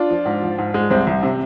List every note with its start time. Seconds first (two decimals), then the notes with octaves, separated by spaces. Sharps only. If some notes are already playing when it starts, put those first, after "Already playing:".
Already playing: D4 F4
0.10 F3
0.25 G#2
0.43 F3
0.58 G#2
0.74 G#3
0.90 C2 C4
1.07 C2
1.23 C3